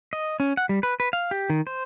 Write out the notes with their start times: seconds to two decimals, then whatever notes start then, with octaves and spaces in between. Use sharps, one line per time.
0.13 D#5
0.40 C#4
0.57 F#5
0.69 G3
0.83 B4
1.00 B4
1.13 F5
1.31 G4
1.50 D#3
1.67 C5